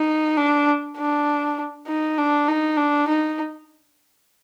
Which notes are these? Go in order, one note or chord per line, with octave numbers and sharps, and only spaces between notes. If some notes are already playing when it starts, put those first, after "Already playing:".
Already playing: D#4
D4
D4
D#4
D4
D#4
D4
D#4